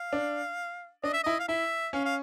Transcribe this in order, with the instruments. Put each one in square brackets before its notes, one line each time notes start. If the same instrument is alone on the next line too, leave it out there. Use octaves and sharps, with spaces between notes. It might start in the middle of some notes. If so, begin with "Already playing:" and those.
Already playing: [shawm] F5
[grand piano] D4
[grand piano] D4 [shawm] D#5
[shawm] E5
[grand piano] E4 [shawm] D#5
[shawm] F5
[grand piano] E4 [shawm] E5
[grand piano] C#4 [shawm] F5
[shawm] F5